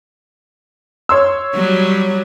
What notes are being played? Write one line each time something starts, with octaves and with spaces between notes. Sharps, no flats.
C#5 C6 E6
F#3 G3